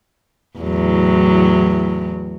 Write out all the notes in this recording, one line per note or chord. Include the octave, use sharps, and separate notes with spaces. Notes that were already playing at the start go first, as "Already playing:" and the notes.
E2 A2 F#3